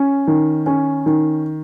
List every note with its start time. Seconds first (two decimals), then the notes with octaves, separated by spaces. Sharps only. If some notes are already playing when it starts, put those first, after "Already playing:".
Already playing: C#4
0.27 D#3
0.66 C#4
1.06 D#3